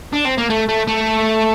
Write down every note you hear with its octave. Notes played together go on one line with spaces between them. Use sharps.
D4
C4
A#3
A3
A3
A3